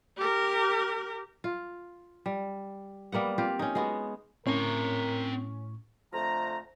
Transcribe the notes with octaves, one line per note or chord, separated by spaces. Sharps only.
G4 A#4
F4
G3
G3 A#3 B3 F#5
C4 F4 G4
C#4 D#4
G#3 B3 F#4
A2 C4 C#4 A#4 A#5 C#6
F2 D3 F3 A3 A#5